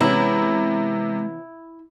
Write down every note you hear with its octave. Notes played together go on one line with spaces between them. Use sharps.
C3 E3 G#3 B3 C#4 E4